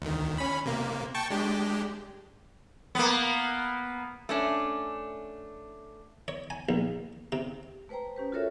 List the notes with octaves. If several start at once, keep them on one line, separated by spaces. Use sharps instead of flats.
D2 D#3
C#4 B5
C3 A#3
G5 A5 C#6
G#3 D4 G4
A#3 B3
A3 C#4 D4
C#5
G#5
A#1
C3
A3 B4 C5 G5 A#5
C#4 G4 B4
F4 F#4 A4 A#4 C#5 E5